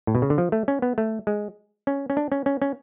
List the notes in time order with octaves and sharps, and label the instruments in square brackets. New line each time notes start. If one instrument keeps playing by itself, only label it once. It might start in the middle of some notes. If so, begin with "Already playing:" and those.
[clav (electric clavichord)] A2
B2
C#3
D3
F3
A3
C#4
B3
A3
G#3
C#4
C#4
D4
C#4
C#4
C#4